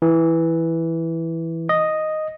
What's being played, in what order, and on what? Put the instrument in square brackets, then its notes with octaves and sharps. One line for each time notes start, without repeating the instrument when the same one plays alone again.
[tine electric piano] E3
D#5